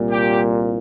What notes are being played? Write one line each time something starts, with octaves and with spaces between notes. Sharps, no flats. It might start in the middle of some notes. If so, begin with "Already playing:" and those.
Already playing: C2 A#2
G4